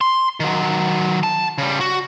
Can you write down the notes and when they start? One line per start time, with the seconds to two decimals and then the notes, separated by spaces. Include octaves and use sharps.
0.01 C6
0.40 D#3 F#3
1.23 A5
1.58 C#3 G3
1.81 F#4